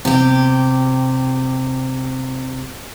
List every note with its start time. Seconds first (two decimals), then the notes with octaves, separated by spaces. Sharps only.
0.05 C3 G4